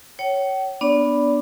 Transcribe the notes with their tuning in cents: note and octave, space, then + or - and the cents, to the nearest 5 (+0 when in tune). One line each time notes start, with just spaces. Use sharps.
C#5 +5 G5 -45
B3 +0 D4 +0 D5 -30